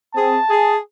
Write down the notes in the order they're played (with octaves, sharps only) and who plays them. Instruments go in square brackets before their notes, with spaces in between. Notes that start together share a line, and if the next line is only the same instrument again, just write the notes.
[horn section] C4 G#4 [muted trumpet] A5
[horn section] G#4